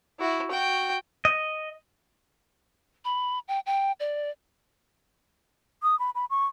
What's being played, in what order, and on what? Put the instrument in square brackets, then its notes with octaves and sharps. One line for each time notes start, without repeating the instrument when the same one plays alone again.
[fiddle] E4 F#4
F#4 G5
[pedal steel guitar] D#5
[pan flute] B5
G5
G5
D5
[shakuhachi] D#6
B5
B5
C#6